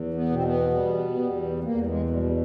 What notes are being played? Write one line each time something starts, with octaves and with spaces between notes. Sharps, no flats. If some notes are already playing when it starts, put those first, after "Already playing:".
Already playing: E2
B3
B2 C4
B3
G3
E2
B3
E2 A#3
G3
G#3
B2 G3
G3